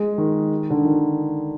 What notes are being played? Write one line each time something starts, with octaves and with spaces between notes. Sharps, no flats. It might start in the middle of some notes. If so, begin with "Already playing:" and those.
Already playing: G#3
D#3
D3
D#3